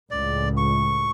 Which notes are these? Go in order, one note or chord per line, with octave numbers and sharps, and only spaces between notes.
C#2 A2 D5
C#6